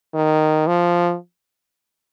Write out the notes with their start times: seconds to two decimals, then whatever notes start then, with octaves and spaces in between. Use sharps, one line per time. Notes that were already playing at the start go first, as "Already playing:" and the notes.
0.14 D#3
0.67 F3